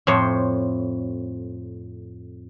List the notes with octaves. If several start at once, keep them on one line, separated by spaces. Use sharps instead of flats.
F2 A2 C5 C#5